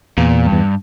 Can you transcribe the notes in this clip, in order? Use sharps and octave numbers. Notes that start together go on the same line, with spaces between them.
E2 A#2
G2
E2